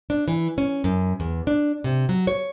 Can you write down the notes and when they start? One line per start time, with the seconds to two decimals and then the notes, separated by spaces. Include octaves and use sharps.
0.10 D4
0.28 E3
0.58 C#4
0.84 F#2
1.20 E2
1.47 D4
1.84 C3
2.09 F#3
2.27 C#5